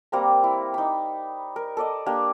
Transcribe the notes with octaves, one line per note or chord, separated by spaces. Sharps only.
G3 A#3 C4 A#5
E4
D#4 B5
A#4
A4 D5 D#5
A#3 D4 G4